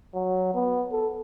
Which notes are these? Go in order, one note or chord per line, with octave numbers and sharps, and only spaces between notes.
F#3
B3
A4